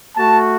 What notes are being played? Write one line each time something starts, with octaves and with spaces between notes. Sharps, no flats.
A3 F#4 A5